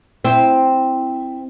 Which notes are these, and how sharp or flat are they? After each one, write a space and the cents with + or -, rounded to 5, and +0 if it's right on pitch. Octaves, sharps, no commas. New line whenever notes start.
C4 +0 E4 +0